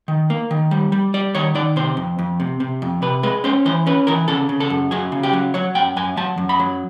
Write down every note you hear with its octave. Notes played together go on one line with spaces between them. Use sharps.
D#3
A#3
D#3
G3
G3
G3 D5
D#3 C#5
D#3 D5
C3 C5
F2
F2
C3
C3
F2
C3 B4
G#3 B4
C#4 C5
E3 C5
C#4 B4
E3 A#4
C#3 A4
C#3
A4
F#2
F#3 G#4
C#3
G4
F#3
F#3 C#5
F#2 G5
F#2 G#5
F#3 A5
F#2
B5
F#3